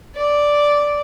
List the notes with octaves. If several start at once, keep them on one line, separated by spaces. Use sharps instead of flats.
D5